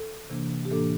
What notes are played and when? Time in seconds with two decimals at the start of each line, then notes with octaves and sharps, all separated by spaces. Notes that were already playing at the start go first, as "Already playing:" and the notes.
Already playing: A4
0.30 C3 E3 A#3 D4
0.65 G4
0.70 A2 E3 A#3 D4 A4